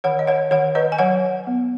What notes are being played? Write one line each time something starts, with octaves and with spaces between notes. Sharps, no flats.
D#3 C#5 F#5
D#5
C#5 F#5
D#3 C#5 F#5
B4 D#5
G#5
F#3 C#5 F#5
B3